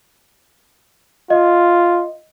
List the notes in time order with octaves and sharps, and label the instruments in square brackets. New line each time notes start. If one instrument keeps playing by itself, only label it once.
[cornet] F4 [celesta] D#5